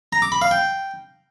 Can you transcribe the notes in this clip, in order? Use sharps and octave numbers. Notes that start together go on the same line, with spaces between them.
A#5
D6
B5
F5
G5